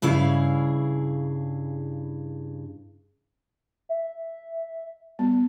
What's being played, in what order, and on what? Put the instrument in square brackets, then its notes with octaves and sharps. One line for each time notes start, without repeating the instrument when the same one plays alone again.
[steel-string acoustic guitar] G2 C#3 E4 G#4 F5
[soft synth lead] E5
[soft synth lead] G3 [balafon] B3